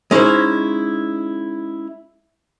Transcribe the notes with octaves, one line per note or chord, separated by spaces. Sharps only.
G#3 C#4 D#4 E4 C5